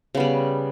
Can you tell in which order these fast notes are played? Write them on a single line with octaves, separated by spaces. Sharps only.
C#3 B3 G3